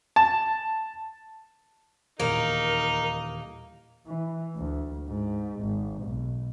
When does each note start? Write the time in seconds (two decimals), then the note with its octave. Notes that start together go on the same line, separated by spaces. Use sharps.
0.16 A5
2.20 D#1 E2 A#3 D#4 A#4
4.07 E3
4.57 D2
5.07 G#2
5.61 G#1
6.03 B1